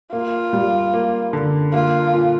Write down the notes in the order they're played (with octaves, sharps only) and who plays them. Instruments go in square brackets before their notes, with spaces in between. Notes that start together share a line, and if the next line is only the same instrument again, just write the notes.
[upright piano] A#3 [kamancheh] F4
[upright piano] G3
A#3
D3
[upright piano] A#3 [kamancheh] F4
[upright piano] A#2